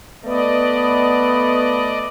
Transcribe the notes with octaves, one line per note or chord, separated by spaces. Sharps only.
A3 B3 D5 D#5